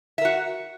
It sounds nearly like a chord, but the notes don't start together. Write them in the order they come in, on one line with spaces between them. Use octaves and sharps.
E5 A#4 F#4